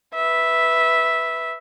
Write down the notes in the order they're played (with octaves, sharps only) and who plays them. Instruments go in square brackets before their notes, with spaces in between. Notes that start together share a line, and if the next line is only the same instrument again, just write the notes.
[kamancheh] B4 E5